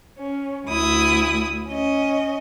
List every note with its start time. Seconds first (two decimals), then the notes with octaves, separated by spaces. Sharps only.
0.18 C#4
0.67 D2 E4 D#6
1.69 C#4 D#5